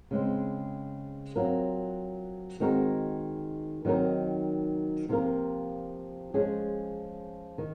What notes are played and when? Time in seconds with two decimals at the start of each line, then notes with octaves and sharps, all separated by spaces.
0.11 C#3 G#3 C4
1.36 F#3 C4 F4 A#4
2.60 D#3 G#3 C4 F#4 A#4
3.85 D#3 F#3 C4 D#4 A#4
5.09 C3 F3 A#3 F4 A#4
6.34 F3 G#3 C#4 G#4
7.58 D#3